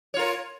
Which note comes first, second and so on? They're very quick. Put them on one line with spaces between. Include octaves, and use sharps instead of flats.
C#5 F4 A#4